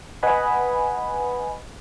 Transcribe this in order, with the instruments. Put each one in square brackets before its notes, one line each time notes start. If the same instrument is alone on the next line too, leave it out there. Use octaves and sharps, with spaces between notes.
[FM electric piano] B4 D#5 F#5 G#5 B5